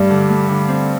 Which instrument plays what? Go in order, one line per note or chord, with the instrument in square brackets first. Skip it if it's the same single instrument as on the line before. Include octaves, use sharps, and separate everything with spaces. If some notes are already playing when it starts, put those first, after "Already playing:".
Already playing: [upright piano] G2 G3 [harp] A3
[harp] D3
A3
D3
C4